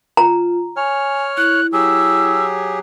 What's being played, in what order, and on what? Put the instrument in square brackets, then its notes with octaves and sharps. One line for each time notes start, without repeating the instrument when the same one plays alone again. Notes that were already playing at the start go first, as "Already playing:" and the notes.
[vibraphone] F4 [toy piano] A#5
[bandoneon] C#5 F6 [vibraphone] G#5
[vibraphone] E4 [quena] F#6
[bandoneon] F#3 G4 G#4 [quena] E6